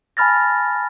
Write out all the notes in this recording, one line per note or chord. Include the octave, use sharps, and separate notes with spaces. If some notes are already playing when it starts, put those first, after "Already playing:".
G#5 A5 B5 F6 A6 A#6